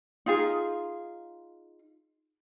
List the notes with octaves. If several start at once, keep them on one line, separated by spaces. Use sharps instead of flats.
D#4 F4 G#4